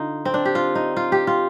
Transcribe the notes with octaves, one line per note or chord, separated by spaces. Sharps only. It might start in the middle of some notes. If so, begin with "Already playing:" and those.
Already playing: D3 D#4 F4
C4
D4
G4
F4
D#4
F4
G4
F4